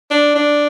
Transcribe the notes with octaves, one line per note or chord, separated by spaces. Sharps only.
D4
D4